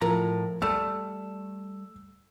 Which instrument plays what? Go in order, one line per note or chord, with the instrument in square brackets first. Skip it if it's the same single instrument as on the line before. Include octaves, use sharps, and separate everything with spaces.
[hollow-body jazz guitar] A2 A#5 [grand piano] F3 A#4
[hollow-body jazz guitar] G3 A3 [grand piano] E6